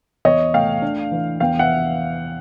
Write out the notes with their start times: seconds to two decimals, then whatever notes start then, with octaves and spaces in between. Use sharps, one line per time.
0.25 E2 C#5 D#5
0.54 A3 F5 G5
0.82 D4
1.12 E3
1.40 E2 F5 G5
1.59 E5 F#5